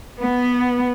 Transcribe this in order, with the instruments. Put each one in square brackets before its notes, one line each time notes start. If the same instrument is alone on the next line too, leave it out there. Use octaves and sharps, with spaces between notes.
[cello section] B3